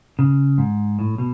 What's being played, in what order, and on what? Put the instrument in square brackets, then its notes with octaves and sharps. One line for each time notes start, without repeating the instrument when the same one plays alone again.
[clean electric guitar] C#3
G#2
A2
B2